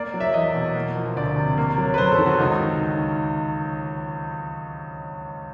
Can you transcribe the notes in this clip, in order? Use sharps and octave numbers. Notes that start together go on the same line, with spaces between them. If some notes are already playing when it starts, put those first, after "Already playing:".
Already playing: A#3 D5
F#3
E5
E2 D#5
B2
A#3
F3
D2 D5
C3
A#3
F#3
B4
F#2 C5
A4
D#3
F#4
C#2 D#4
D#3